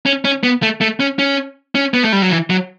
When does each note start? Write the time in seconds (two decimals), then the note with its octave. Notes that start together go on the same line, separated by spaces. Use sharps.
0.06 C#4
0.25 C#4
0.43 B3
0.62 A3
0.81 A3
1.00 C#4
1.19 C#4
1.75 C#4
1.94 B3
2.03 A3
2.13 G3
2.22 F#3
2.31 E3
2.50 F#3